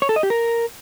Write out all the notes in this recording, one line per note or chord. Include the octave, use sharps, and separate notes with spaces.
C#5
A4
D#5
G4
A#4